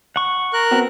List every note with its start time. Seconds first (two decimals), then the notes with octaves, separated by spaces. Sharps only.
0.16 F#5 C#6
0.53 A#4 F#6
0.71 B3 C4 F#4